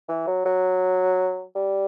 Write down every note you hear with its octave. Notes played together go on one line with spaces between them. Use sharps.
E3
F#3
F#3
G3